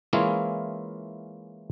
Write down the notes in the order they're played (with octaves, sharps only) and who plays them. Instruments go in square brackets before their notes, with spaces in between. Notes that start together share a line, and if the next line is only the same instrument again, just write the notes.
[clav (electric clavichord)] E3 G#3 A#3 C#4 E4 F4